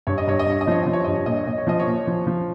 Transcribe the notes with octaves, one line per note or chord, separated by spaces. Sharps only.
G2 C#5
D#5
G2 C#5
D#5
G2 C#5
D#5
F3 C#5
F3 D#5
C#5
G2 D#5
C#5
A#2 D#5
C#5
A#2 D#5
C#5
F3 D#5
C#5
A#2
F3
F3